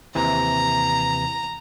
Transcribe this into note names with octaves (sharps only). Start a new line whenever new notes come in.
D#2 C3 E3 A#5